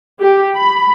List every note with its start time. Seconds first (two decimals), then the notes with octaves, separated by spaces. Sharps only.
0.20 G4
0.56 B5